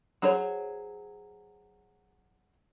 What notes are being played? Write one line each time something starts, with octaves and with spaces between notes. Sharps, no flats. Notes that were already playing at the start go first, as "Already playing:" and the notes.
F#3 G#4 C5 C#5